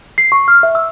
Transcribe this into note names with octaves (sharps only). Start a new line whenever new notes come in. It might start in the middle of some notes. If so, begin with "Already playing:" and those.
C7
C#6
F6
E5
E6